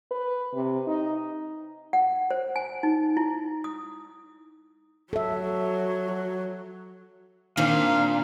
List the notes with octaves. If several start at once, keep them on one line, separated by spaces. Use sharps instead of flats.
B4
C3
D#4
F#5
C5
G#5
D#4
E4
D#6
F#3 A4 E5
A#2 D#3 C4 D4 F5